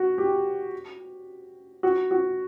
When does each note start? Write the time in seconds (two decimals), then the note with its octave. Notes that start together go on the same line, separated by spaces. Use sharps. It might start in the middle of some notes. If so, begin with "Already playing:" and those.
Already playing: F#4
0.18 G4
1.83 F#4
2.11 F#4